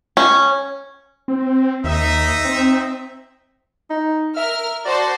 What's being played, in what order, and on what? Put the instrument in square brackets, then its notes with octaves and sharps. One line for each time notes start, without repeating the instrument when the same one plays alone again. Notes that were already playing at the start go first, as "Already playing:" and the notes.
[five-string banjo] C#4
[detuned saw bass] C4
[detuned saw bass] D#2 [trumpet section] D#4 E5
[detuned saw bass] C4
[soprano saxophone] D#4
[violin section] A#4 F6 [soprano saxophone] E5
[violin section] F#4 C5 A5 [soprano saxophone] D5